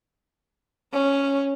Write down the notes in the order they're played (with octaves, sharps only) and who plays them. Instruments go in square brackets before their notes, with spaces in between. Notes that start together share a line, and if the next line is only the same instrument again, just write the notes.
[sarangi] C#4